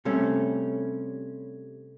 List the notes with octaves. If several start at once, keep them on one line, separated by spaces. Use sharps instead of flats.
C3 G3 A3 C#4